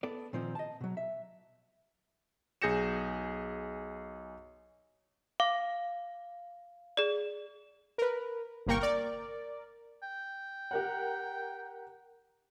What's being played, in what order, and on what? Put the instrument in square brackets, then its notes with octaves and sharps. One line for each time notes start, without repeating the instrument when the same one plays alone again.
[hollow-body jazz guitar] B3 A4 D5
A#2 D#3 F3 C4
D#5 A5
B2 F#3
E5
[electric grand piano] B1 G#4 G6 A#6 C#7 E7
[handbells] F5 [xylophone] D6
[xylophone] G#4 D5
[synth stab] A#4 B4
G1 C2 A#3 A#4 G5 C#6
A#4 D5
[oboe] G5
[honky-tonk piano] G4 A#4 F#5